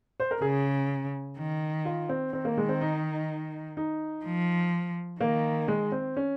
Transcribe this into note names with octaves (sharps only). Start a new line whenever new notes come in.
C5
A#4
C#3 G#4
D#3
F4
C4
D#3 C4
A#3
G#3
C4
D#4
D#4
F3
D#3 A#3
G#3
C4
C#4